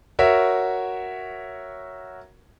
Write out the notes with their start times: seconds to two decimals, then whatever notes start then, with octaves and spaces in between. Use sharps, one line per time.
0.19 F#4 A#4 C#5 E5